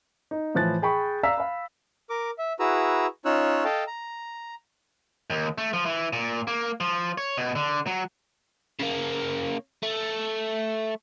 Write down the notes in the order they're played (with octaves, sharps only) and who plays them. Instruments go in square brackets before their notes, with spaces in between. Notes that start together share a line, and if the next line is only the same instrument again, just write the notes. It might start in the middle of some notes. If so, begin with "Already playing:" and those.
[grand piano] D#4
A2 E3 F3 F#6 A6
G#4 G5 B5 C#6
D5 F5 A#5 E6 B6
F5 B5
[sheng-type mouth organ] A#4 D6
E5
E4 F#4 G#4 B4 A#5 E6
C#4 D#4 F4 C#5 E6 F#6
A4 D#5 F5 G5 A5
A#5
[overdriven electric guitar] D#2
A3
F3
E3
A#2
A#3
F3
C#5
B2
D3
F#3
C#3 A#3
A3